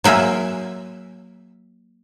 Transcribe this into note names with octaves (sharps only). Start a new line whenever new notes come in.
F#3 A#3 E5 G#5